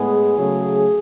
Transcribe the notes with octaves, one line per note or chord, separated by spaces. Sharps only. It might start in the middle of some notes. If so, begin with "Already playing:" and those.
Already playing: A2 G#3 B3 G#4
C#3 F#3 A3